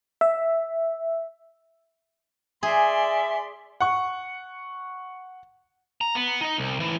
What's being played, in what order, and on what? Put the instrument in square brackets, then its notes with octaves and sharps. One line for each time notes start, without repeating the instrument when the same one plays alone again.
[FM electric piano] E5
[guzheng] G#4 [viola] D5 C6 [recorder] E5 [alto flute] G#5
[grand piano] F#5 C#6
[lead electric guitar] A#5
B3
D#4 D#5
C2
A2 E3